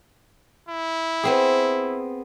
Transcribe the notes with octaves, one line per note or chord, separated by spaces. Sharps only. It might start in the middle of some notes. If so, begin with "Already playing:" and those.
E4
B3 C4 G#4